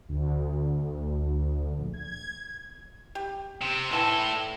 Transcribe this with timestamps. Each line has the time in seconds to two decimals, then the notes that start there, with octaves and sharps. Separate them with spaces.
0.09 D2
1.78 A#1
1.94 G#6
3.15 G4
3.61 C3
3.91 A2 D3 E3 A4 A5